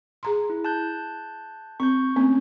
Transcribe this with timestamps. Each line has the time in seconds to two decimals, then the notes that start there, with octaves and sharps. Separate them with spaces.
0.23 G#4 A#5 C6
0.50 E4
0.65 A5 F#6 G6
1.80 C4 C#6 G6
2.16 A3 A#3 C4 C#4